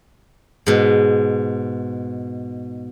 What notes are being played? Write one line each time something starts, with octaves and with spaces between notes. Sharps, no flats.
G#2 B2